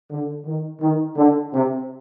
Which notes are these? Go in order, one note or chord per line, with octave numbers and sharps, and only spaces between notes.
D3
D#3
D#3
D3
C3